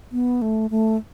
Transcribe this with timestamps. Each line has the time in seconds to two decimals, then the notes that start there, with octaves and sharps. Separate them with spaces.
0.12 B3
0.42 A3
0.70 A3